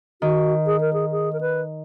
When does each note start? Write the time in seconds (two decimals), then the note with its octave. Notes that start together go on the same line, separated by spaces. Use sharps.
0.22 D#3 F#4
0.66 G#4
0.81 A#4
0.93 G#4
1.11 G#4
1.33 A#4
1.41 B4